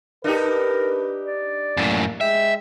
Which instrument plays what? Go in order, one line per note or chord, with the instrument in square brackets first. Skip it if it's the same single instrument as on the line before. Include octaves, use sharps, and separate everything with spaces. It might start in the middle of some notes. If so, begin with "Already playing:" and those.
[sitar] D4 D#4 G4 [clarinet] A#4 [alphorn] B4
[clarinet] D5
[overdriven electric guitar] F#2 A2 [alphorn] A#3
[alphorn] G#3 [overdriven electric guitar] E5 [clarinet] G5